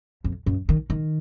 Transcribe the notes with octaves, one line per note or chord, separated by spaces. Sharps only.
F2
F#2
D#3
D#3